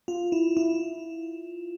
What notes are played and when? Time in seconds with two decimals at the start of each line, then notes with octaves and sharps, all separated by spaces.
0.08 F4
0.32 E4
0.57 E4